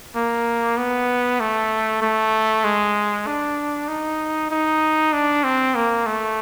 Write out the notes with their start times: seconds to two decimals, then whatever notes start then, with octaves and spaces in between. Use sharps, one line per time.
0.15 A#3
0.78 B3
1.40 A3
2.02 A3
2.64 G#3
3.27 D4
3.89 D#4
4.51 D#4
5.13 D4
5.44 C4
5.75 A#3
6.06 A3